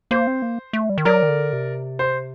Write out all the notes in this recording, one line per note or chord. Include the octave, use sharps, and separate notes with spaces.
A#3 C5
C4
A#3
A3
G3
D#3
F#3 A#4 D5
D#3
D3
C3
C5